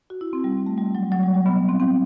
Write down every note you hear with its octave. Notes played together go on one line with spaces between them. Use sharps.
F#4
E4
C4
G3
A3
G3
F#3
F#3
G3
G3
B3
B3
C4
C4